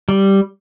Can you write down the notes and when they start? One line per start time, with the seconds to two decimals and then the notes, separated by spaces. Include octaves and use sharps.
0.09 G3